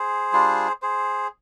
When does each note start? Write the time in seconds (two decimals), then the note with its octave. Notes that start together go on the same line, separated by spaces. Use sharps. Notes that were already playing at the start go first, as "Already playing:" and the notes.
Already playing: G#4 C5
0.33 G3 D4 F4
0.82 G#4 C5